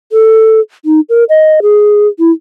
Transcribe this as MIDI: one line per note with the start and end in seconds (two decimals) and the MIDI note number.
0.12 0.60 69
0.85 1.00 63
1.09 1.24 70
1.29 1.60 75
1.62 2.07 68
2.19 2.31 64